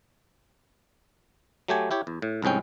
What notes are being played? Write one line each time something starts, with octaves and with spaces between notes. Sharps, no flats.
F#3 A3 G4 G#5
E4 G4 C#5
E2
A2
C2 F2 G#2 C#4 G5